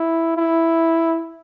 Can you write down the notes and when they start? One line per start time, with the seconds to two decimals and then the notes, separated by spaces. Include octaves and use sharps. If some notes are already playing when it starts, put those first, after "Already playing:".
Already playing: E4
0.37 E4